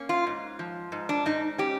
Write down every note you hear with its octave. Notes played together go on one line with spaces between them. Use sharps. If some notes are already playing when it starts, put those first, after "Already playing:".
Already playing: A#3 C#4
F4
G#2
F3
G#2
D4
G#2 D#4
C#4 G4